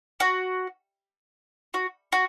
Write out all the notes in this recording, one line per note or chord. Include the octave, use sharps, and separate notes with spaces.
F#4
F#4
F#4